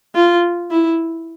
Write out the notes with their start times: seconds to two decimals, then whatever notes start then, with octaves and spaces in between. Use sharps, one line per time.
0.15 F4
0.70 E4